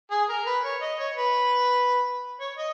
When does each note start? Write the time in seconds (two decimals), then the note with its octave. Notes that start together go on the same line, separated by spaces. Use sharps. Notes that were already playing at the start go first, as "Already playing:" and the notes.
0.11 G#4
0.29 A#4
0.46 B4
0.64 C#5
0.81 D#5
0.99 C#5
1.17 B4
2.40 C#5
2.57 D#5